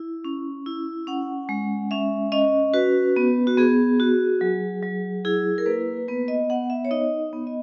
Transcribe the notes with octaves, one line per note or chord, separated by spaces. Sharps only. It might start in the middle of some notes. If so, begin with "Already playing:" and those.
Already playing: E4
C#4
E4
C#4 F#5
G#3
C#4 E5
C#4 D#5
F#4 B4
B3
F#4
B3 G#4
F#4
F#3
F#3
E4 G#4
A#4
A#3 B4
B3 B4
D#5
B3 F#5
E5
C#5
D#4 D#5
B3
D#5